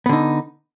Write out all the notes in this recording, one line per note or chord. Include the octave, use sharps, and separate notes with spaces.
D3 B3 D#4